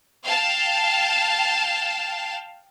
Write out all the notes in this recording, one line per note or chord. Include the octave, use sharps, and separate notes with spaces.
F5 G5 A5